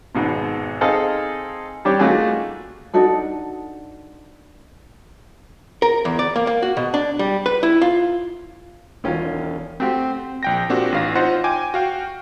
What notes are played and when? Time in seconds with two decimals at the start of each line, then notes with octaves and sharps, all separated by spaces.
0.15 G#1 G#2 B2
0.81 C4 D#4 G#4 A4 D#5 F5
1.85 G3 D4 G4 C#5
1.99 A3 A#3 D#4 F4 F#4 G#4
2.94 D4 D#4 F#4 A4
5.82 A#4
6.05 E2
6.19 D5
6.36 A#3
6.47 A#3
6.62 F#4
6.77 B2
6.94 D4
7.19 G3
7.46 B4
7.63 E4
7.82 F4
9.04 E1 D#3 C#4 F4
9.80 A3 C4 F#4 G4
10.43 A#1 G5 A#6
10.69 A#2 C4 D4 F#4 G4
10.92 A1 F5 A#6
11.15 D#4 F4 C5 F#5
11.44 G5 G#5 D6
11.74 F#4 F5 G5